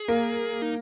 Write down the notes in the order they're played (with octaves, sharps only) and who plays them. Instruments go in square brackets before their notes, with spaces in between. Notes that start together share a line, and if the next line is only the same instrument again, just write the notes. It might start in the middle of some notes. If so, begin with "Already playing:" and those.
Already playing: [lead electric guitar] G#4
[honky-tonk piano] A#3
[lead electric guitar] D#4